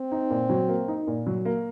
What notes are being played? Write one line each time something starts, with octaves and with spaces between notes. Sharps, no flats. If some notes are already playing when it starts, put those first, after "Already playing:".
Already playing: C4
D#4
A#2
F#3
A#3
D#4
A#2
F#3
A#3